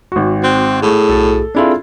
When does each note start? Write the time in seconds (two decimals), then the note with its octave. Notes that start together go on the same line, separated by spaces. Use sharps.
0.12 G#1 F#4
0.44 C4 F#6
0.82 A2 G#4
1.09 B1 F#4 A4
1.55 C4 D4 E4 F4 G#4 A4